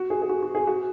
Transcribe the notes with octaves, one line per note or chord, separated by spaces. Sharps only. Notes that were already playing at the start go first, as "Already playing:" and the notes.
Already playing: F#4
G#4
G#4
F#4
F#4
G#4
F#4